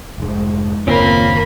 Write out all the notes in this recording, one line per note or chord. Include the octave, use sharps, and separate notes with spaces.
F1 G#2
F#1 D#2 A#2 A#3 C4 C#4 B5